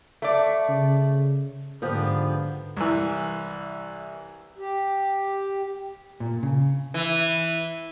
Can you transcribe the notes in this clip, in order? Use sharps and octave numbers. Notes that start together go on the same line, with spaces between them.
A3 D5
C#3
G#2 D3 F3 B3 G4
C2 E3
G4
A#2
C#3
E3